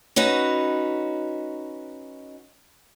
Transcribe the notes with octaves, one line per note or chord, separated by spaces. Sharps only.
C#4 D#4 F#4 B4